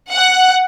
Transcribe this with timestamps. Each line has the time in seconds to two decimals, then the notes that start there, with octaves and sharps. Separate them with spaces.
0.11 F#5